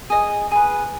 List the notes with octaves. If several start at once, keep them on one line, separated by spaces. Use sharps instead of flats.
G#4 D#5
G#4 B4